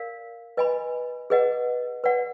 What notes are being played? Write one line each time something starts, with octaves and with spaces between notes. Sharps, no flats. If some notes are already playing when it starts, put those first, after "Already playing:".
Already playing: A#4 D5 F5
B4 D#5 G#5 B5
G#4 B4 D#5 F#5
B4 D5 F#5